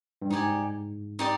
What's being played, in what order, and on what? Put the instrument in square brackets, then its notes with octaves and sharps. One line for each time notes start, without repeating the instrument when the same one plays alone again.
[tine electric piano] G2
[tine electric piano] G#2 [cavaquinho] D#4 G4 D5 G#5
[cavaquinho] D#4 G4 D5